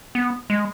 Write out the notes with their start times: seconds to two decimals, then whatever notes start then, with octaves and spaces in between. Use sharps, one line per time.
0.15 B3
0.50 G#3